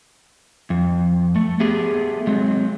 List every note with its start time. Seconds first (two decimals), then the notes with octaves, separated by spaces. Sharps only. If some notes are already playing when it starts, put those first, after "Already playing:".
0.70 F2
1.36 A3
1.60 A3 B3 G4 G#4
2.27 F#3 G#3 C4